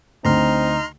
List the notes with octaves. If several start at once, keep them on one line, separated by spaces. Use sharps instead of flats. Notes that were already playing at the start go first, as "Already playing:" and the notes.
D2 C4 D#4 A#5 C6 F6